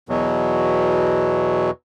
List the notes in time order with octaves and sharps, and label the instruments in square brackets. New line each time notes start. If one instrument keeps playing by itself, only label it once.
[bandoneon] E2 B2 F#3